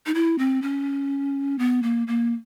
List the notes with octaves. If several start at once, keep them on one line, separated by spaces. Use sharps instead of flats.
D#4
E4
C4
C#4
B3
A#3
A#3